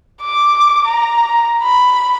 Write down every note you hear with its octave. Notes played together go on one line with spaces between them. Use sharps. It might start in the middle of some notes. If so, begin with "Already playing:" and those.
D6
A#5
B5